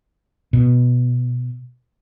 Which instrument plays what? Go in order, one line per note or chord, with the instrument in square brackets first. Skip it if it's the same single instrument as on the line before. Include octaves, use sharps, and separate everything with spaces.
[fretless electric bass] B2